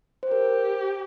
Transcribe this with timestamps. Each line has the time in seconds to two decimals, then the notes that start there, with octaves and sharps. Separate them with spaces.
0.23 C5
0.30 G4 A#4